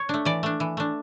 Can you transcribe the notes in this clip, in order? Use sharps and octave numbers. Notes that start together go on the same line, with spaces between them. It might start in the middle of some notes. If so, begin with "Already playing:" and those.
Already playing: C#5
A3 D4
E3 D5
A3 D4
E3
A3 D4